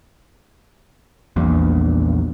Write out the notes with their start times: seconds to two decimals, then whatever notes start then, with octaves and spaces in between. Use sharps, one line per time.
1.36 A#1 E2 G2 A#2